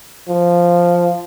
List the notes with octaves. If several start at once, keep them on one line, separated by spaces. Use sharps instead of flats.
F3